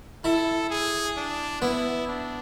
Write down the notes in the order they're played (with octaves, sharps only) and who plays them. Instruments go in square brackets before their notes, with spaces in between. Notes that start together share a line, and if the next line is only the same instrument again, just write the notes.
[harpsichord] E4 [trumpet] A4
[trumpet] G#4
D4
[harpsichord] B3 [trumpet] E4
[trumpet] D4